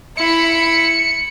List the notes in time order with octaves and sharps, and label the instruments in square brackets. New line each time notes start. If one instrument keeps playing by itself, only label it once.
[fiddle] E4 B5 [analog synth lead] C#7